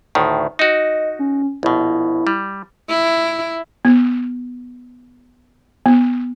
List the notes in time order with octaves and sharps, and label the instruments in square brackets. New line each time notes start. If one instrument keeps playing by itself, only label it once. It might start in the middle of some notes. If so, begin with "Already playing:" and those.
[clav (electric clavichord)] D2 A2 D#3
[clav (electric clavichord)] D#4 F#4 [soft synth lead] D#5
[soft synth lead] C#4
[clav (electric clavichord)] A#1 B2 [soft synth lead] E4
[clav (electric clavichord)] G3
[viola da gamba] E4
[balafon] B3
B3